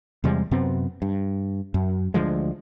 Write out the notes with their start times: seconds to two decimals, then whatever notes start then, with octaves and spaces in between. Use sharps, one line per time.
0.24 E2 C3 G3 G#3
0.51 F#2 C3 B3 C4
1.02 G2
1.74 F#2
2.14 D2 D3 F3 G#3